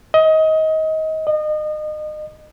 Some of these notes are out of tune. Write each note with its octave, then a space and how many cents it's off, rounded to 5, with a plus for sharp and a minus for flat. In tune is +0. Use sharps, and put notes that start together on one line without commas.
D#5 +25
D#5 -30